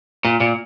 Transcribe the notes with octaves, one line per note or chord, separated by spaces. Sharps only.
A#2
A#2